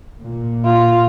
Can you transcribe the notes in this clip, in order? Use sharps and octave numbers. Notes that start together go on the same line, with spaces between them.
A#2
F4